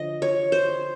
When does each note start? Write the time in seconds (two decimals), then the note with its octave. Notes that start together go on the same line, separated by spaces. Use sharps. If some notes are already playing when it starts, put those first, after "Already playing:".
Already playing: D3 F3 D#5
0.22 C#5
0.52 C5